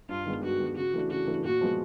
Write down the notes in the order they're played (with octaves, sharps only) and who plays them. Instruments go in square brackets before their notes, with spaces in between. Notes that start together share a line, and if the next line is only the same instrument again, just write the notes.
[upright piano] G2 [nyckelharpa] F4
[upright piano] D#3 G#3 B3
[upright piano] G2 [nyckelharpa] F#4
[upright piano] D#3 G#3 B3
[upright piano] C#3 [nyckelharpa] F#4
[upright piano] E3 A3 D4
[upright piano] C#3 [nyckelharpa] F#4
[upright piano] E3 A3 D4
[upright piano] A#2 [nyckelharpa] F#4
[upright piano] F3 G#3 B3